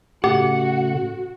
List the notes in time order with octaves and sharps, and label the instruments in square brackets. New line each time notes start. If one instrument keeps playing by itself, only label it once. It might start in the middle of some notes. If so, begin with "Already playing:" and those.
[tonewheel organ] A2 C#3 A3 [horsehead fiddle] F#4 [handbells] G4 [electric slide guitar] F#5